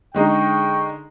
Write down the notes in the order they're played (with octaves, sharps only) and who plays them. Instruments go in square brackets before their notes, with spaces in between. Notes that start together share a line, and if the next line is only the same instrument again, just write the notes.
[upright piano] D3 G#3 D#4 [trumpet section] G5 C#6